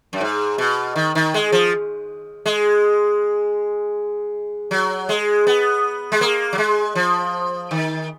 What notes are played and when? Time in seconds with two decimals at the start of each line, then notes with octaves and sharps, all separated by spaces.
0.13 F#2
0.21 G#2
0.58 B2
0.96 D#3
1.15 D#3
1.34 G#3
1.52 F3
2.46 G#3
4.71 F#3
5.09 G#3
5.47 B3
6.12 G#3
6.21 A#3
6.53 F#3
6.58 G#3
6.95 F3
7.71 D#3